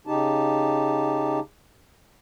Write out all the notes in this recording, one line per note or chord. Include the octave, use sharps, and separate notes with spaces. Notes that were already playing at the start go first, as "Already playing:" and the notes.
C#3 D#4 G4 A5